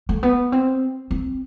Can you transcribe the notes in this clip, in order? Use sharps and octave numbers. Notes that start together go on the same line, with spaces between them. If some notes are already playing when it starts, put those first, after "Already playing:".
A3
B3
C4
C4